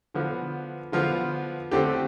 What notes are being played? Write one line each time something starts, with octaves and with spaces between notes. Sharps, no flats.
D3 F3 B3
D3 F3 B3 F4
D3 A3 C4 G4